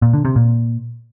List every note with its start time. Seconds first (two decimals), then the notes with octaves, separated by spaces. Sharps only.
0.02 A#2
0.13 D3
0.25 C3
0.36 A#2